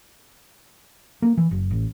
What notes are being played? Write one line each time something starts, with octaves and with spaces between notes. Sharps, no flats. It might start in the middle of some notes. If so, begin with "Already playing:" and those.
A#3
E3
F#1
A1